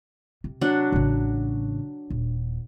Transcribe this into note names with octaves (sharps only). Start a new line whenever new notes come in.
C3
F#3 D4 F#5
A1 C#3
D#1